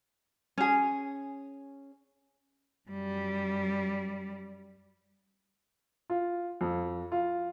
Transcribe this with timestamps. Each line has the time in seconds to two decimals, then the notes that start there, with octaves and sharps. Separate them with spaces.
0.58 C#4 G#4
2.90 F#2 G3
6.10 F4
6.61 F2
7.12 F4